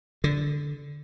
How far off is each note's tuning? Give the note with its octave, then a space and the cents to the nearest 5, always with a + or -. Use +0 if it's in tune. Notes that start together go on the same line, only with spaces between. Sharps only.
D3 -10